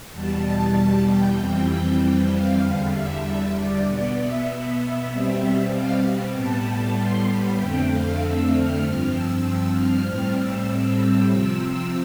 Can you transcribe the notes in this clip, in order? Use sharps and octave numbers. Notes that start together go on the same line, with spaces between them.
E2 B2 G3 A5
A5
G5
F2 E3 G3 C4
G5
G5
F5
E2 D3 G3
E5
D5
B2 B3
E5
E5
E5
B2 G3 C4
F5
A2 G3 B3 A5
C6
B5
F2 D3 A3 C4 G5
F5
E6
F6
G2 F3 C4
E6
F6
A2 G3 C4
E6
C3 F3 C4 E6
E6